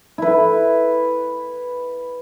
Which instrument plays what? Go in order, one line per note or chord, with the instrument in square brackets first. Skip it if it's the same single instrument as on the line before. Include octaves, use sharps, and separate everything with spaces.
[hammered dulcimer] E4 B4